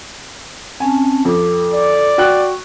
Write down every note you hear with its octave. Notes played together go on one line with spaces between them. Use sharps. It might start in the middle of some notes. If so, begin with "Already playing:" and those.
C4 C#4 G#5 A5
F2 A4 D6
D5
F#4 G5 C#6 F#6